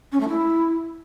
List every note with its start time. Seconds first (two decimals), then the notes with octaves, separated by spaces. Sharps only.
0.12 C#4
0.20 A3
0.29 E4